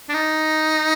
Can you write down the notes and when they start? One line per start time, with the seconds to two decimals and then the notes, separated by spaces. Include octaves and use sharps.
0.09 D4
0.14 D#4